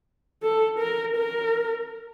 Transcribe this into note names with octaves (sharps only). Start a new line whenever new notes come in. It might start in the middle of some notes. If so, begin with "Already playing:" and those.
A4
A#4
A#4